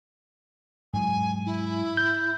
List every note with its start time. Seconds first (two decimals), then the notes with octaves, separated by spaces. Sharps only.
0.93 G#2 F#3 G#5
1.46 E4
1.97 G6